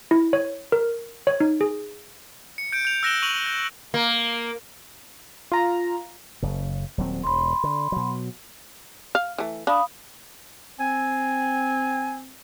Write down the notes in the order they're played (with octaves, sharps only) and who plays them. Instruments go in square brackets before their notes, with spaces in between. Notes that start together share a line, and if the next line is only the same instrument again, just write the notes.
[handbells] E4
C#5
A#4
C#5
D#4
G#4
[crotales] C#7
G6 D7
G6 F7
E6 F#6 A#6 D7 E7 G7
C#6 D#7 F7 F#7
G6
[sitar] A#3
[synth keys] F4 A#5
[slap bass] F#1 C#3
D#1 F#3 C4
[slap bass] E1 [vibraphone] B5 C6
[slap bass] D3
B2 F#3
[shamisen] F5
E3 A3
[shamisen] D4 [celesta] F5 B5 D#6
[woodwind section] C4 [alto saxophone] G#5